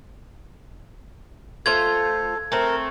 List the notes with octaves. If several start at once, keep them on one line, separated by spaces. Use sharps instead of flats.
A3 F4 A4 C5 G#6
A3 C4 A#4